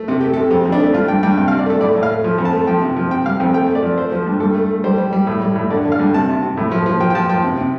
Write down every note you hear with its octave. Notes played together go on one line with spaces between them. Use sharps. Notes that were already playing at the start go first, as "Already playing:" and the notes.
Already playing: A3
C3 A4
A3 G4
A4
C3
F2 G4
F2
D4
A3
G2 F4
G2 G5
G2 G5
C3 G5
F5
C3
D5
A3 A4
A2 D5
A2
F5
A3
F3
F2
A5
A3
F3 G5
C3
F3
C3 G5
G3 F5
F2 G5
A3 G5
A3
D5
F3
A3 C5
F3
G2
G2 A4
A3
A3
G3 C5
G3
G3
A2
G3
A2
D3 D5
D3
F5
G2
C3 A5
C3
C3
A2
F3
F3
F3 G5
G5
F3 A5
F3 G5
C3
C3